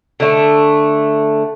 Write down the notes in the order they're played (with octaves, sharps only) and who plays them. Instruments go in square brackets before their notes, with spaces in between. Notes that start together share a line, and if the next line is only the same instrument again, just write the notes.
[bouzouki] D3 A3